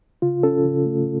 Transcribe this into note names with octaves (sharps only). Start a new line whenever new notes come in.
C#3 F4
C#4 A4
C#3
A3